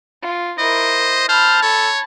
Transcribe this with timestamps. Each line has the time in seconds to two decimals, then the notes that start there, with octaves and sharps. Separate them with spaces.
0.22 F4
0.59 E4 A#4 C5 D#5
1.29 C5 A5 B5 F6
1.63 A4 C#5